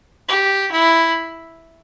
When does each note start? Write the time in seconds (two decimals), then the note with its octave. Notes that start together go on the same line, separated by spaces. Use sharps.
0.29 G4
0.72 E4